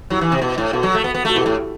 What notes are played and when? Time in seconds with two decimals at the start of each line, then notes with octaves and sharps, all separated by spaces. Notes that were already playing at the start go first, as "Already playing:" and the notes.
0.10 F#3 E4 G4
0.21 E3
0.32 C3
0.42 B2
0.58 A2
0.73 B2 F#4 A4
0.83 F#3
0.95 A3
1.04 B3
1.14 B3
1.25 A3 F#4
1.35 B2 E4 G4
1.46 A2